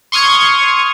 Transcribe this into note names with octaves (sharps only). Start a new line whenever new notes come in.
C6 C#6 D#6 F6 G#6